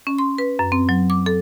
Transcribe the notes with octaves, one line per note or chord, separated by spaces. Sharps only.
C#4
C6
B4
F#2
C4
F#3
D6
A4